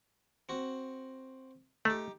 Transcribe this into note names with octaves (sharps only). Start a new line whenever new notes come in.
C4 F#4
A3 D#4 G4